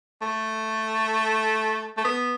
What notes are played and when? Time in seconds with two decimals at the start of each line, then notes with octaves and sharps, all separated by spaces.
0.22 A3
1.98 A3
2.05 B3